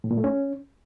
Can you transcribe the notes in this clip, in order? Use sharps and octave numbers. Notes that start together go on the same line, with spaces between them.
A2
A#2
A3
C#4